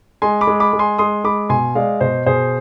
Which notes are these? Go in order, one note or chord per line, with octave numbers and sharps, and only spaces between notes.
G#3 G#5 C6
B5 D6
G#3
B5 D6
G#3
G#5 C6
G#3 C6 D#6
G#3 B5 D6
B2 G#5 C6
G#3 D5 F5
B2 C5 D#5
B2 G#4 C5